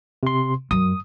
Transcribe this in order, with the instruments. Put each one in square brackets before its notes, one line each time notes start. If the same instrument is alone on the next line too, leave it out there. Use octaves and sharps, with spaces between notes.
[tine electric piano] C3 C6
[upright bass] F#2 [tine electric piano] D#6